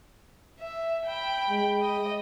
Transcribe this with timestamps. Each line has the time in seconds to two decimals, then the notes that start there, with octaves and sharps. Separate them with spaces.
0.60 E5
1.06 G5 B5
1.50 G#3
1.81 D#5